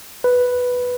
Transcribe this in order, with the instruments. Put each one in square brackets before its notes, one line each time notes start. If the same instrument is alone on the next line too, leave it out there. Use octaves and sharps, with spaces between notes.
[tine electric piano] B4